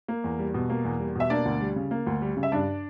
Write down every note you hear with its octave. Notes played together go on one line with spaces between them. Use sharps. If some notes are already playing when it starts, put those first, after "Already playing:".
A#3
E2
G3
B2
A#3
E2
G3
B2 E5
A#3 D4 D5
D2
G3
C#3
A#3
D2
G3
C#3
E5
G2 D4 D5